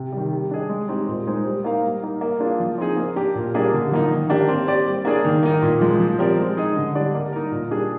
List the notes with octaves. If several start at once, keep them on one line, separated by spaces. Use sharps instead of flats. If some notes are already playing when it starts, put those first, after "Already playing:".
Already playing: C3
D#3 G3
G3
D4 G#4 D#5
G#3
C4 D#4 G4
A#2
G#3 D#4 G#4 C5
G3
A#3 D#4 A#4 F5
G3
A#3 D#4
A#3
D4 F4 G#4
F3
C4 D#4 G#4
A#3
D4 G4 A#4
A#2
G3 A#3 D4 G#4
D3
F3 A#3 D#4
D#3
A#3 D4 G4
C4
G4 D5
G3
A#3 D4 G#4 D5
D#3
A#3 D#4 A#4
A#2
F3 G#3
F3
C4 G4 A#4 D5
G#3
D#4 G#4 D#5
D3
G3 D4 G4 D5
A#3
D#4 A#4
A#2
G3 D4 G#4